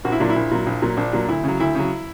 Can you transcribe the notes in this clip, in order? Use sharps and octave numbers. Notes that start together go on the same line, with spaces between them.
A#1 F#4
E4
A#2 F#3 D4
E4
A#1
A#2 F#3
A#1
A#2 F#3
A#1 D4
A#2 F#3
D2 E4
C#3 F#3
D2 E4
C#3 F#3